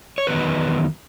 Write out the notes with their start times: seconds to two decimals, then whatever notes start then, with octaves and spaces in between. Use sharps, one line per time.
0.18 C#5
0.27 E2 D#3 F#3 B3 D#4 B4